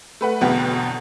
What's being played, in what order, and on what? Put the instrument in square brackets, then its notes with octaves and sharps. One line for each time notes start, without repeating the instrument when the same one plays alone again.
[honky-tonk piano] A3 B4 F#5
G1 E2 B2 B3 F#5 G5